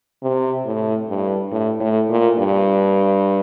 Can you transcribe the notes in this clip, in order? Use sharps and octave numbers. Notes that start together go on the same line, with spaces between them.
C3
A2
G2
A2
A2
A#2
G2